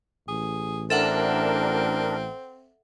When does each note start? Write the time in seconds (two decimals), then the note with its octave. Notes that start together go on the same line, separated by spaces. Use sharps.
0.28 A1 G#4
0.90 C4 D4 A4 A#4 E5 F#5